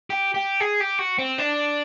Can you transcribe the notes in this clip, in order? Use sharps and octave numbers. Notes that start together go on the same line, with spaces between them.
G4
G4
G#4
G4
F#4
C4
D4